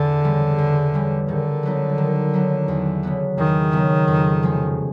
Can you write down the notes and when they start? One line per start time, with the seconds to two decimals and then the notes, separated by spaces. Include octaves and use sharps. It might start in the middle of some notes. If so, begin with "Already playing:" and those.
Already playing: E2 D3
0.24 C#3 E3 G3
0.58 E2
0.94 C#3 E3 G3
1.28 D3 D#3
1.63 F#3 B3 D#4
1.98 D#3
2.33 F#3 B3 D#4
2.68 E2
3.03 C#3 F#3 B3
3.38 E2 D#3
3.72 C#3 F#3 B3
4.08 F2
4.42 C3 F3 G#3 C#4